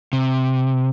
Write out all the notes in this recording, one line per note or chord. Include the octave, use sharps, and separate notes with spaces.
C3